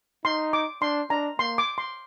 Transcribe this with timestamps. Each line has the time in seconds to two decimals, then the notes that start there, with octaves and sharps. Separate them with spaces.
0.25 D#4 C6
0.53 D6
0.82 D4 C6
1.10 D4 A#5
1.39 A#3 C6
1.58 D6
1.78 C6